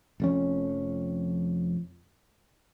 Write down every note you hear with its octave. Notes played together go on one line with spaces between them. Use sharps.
F1 F2 C#4